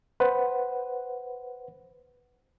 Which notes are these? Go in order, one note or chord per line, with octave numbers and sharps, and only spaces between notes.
B4 C5 F#5